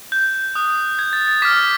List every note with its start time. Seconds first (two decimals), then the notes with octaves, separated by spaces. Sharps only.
0.12 G6
0.55 D#6 F#6
0.99 G#6
1.13 A6
1.27 A6
1.42 D6 F6 B6